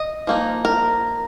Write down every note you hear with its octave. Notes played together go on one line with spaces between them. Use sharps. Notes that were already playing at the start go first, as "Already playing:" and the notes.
Already playing: D#5
F3 A#3 D#4
A#4